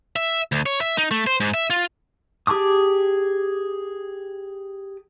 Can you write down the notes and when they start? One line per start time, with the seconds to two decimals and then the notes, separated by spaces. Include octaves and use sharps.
0.16 E5
0.52 D2
0.66 C#5
0.81 E5
0.98 D#4
1.11 A3
1.27 C5
1.40 G#2
1.54 E5
1.70 F4
2.47 G4 G#4 A5 D6 D#6